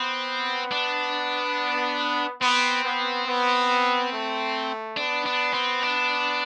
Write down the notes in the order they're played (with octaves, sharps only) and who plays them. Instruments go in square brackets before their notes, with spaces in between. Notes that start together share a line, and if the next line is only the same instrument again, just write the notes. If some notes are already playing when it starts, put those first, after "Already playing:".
Already playing: [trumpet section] B3 [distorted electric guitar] C4
[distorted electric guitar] D4
[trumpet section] B3 [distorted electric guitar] C4
[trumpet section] B3
B3
A3
[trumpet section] B3 [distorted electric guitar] D4
[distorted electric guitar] D4
C4
D4